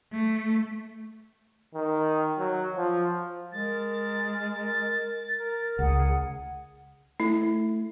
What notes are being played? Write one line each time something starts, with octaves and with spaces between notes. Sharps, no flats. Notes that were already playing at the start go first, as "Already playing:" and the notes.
A3
D#3
F#3
F3
G#3 A#4 A6
A#4
C#2 G#4 F#5
A3 E4